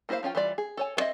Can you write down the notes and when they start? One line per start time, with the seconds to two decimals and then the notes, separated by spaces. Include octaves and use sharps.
0.09 A#3 E4 G#4 C5 F5
0.23 F3 C#4 F4 G5
0.35 E3 G3 F4 D5
0.58 G#4
0.77 A4 C#5 G#5
0.97 B3 C4 C#5 D#5 E5